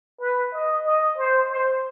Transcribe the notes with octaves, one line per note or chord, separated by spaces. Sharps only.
B4
D#5
D#5
C5
C5